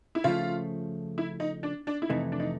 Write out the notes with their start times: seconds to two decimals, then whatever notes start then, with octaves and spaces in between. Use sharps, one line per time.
0.15 E4
0.24 C#3 F3 A3 F4
1.18 E4
1.40 D#4
1.63 D4
1.87 D4
2.02 E4
2.10 F2 C3 E3 A3 D#4
2.32 D4
2.40 D#4